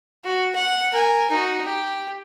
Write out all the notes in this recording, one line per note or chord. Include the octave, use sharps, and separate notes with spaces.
F#4
F#5
A#4 G#5
D#4 F#4
G4